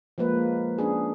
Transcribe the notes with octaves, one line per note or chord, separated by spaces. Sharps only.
F3 G#3 A#3 B4
C#4 D4 G#4